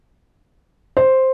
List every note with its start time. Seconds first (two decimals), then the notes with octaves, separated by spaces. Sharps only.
0.97 C5